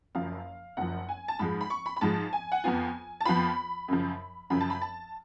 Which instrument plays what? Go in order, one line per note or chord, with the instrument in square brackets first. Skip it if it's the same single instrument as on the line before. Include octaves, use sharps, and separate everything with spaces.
[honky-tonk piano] F#1 F#2 F3 F5
F#1 F#2 F3 F#5
G#5
A5
G#2 F3 G#3 B5
B5
C#6
B5
B5
G#2 F3 G#3 A5
G#5
F#5
F2 F3 B3 F4 G#5
A5
F2 F3 B3 F4 B5
F#2 C#3 F3
F#2 C#3 F3 B5
A5
B5
A5